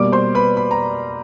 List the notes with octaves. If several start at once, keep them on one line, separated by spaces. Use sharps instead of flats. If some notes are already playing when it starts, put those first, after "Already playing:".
Already playing: B2 G3 A#3 D5 D6
C5 C6
B4 B5
B5
A#5